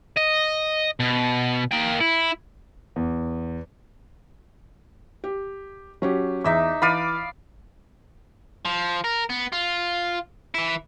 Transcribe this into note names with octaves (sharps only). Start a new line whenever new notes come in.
D#5
B2
A#3 G5
E4
E2
G4
F#3 C#4 G4
E2 D#4 E5 D6
E3 D5 F5 B5 D#7
F3
A#4
B3
F4
E3 E4